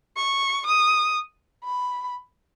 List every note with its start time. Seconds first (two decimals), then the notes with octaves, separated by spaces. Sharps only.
0.17 C#6
0.66 D#6
1.64 B5